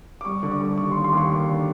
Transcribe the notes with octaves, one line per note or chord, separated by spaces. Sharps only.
D6
G3 C#6
D3 C#6
D6
G3
D6
D#2 C#6
C6
D#2
C6
D#2 D6
C#6
A#3 D6
D3